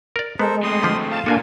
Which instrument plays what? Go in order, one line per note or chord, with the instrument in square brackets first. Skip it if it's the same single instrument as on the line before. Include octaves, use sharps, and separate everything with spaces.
[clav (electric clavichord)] A#4 D5
[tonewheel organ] G#3 [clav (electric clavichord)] B3 [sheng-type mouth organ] A4 A#4 C5
[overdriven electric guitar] A2 C4 [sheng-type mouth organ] C6 D#6
[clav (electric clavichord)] D3 F3 B4
[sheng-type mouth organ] F5 [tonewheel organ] A5
[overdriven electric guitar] A#2 [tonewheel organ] A#3 D4 G#5 [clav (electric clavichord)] F4 F#4 A4